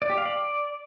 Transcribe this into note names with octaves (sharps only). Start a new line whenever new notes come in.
D5
G4
F5
D5